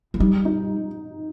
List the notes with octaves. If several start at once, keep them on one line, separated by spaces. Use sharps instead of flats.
F3
G3 D#4
D#4